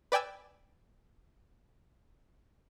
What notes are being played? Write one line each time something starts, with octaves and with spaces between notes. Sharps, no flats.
B4 D5 G5 G#5 E6